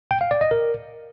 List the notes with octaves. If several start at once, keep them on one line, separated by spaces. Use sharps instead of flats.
G5
F5
D5
D#5
A#4